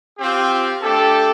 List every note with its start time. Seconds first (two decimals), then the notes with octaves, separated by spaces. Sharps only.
0.19 C4 F4 G4
0.82 A3 D4 G4 A4